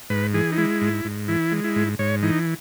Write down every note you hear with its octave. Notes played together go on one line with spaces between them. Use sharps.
G#2 B4
E3 G#4
D#4
G#3 E4
G#2
G#2
E3 E4
G#3
E4
G#2
G#2 C#5
E3 D#4